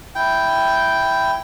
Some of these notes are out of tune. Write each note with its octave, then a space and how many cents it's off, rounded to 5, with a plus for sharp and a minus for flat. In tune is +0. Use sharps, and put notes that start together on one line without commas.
E4 +0 G5 +0